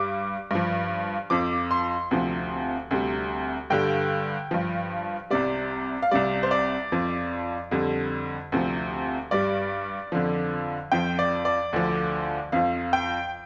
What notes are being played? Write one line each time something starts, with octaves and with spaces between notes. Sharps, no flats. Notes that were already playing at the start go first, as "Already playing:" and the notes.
Already playing: G2 G3 D6
G2 F3
F2 F3 D6
C6
D2 C3 F3
D2 C3 G3
G2 D3 G3 G5
G2 F3
C2 C3 G3 D5
F5
C2 C3 G3 D5
C5
D5
F2 F3
F2 D3 G3
D2 C3 F3
G2 G3 D5
F2 D3 F3
F2 F3 G5
D5
D5
D2 D3 F3
F2 F3 F5
G5